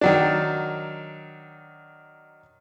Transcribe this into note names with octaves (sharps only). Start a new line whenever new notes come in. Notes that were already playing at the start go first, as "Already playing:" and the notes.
D#3 F#3 D4